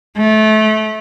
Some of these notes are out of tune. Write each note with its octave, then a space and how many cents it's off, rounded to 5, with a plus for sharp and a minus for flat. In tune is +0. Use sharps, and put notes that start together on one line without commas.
A3 -25